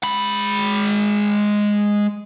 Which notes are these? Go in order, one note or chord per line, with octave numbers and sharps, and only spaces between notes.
G#3 B5